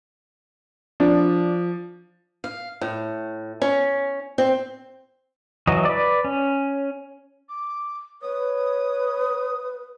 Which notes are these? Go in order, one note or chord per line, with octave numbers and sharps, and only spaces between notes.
F3 D4
F5
A2
C#4
C4
E3 F#3 D#5
B4 D5
C#4
D6
B4 C#5 D#6